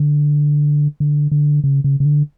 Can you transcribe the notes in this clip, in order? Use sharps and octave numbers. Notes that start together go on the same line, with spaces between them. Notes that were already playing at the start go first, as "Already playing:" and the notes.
Already playing: D3
D3
D3
C#3
C#3
C#3
D3